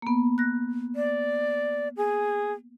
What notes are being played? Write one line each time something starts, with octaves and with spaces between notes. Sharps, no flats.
A#3 B3
F#6 A#6
D5
G#4